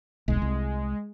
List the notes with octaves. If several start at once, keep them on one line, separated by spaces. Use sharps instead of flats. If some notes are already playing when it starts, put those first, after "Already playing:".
D#1 B1 G#3
C2